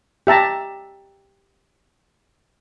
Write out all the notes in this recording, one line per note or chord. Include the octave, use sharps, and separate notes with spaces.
G4 E5 A5 A#5